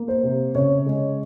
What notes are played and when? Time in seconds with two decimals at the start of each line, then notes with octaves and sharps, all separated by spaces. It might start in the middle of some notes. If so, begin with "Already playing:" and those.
Already playing: A#3
0.08 C5
0.23 C3
0.55 C#3 C#5
0.86 G#3